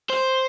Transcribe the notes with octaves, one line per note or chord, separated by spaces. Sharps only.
C5